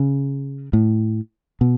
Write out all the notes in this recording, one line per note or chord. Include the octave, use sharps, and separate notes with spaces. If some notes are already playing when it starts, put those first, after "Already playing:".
Already playing: C#3
A2
B2